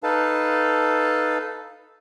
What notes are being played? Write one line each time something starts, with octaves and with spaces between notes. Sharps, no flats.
D#4 A4 B4 F5 A5